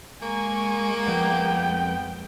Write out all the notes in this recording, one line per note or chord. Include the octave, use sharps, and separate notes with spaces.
G#3 A#3 G#5 C#6
F2 F3 B3 G5